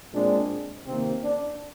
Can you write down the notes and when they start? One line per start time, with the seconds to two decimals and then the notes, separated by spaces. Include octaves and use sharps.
0.12 A#2 G#3 C4 D4
0.87 C3 D#3 A#3 C4
1.23 D4